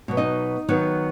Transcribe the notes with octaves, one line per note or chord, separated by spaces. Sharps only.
B2 F#3 B3
D#4 D#5
D#3 F#3 B3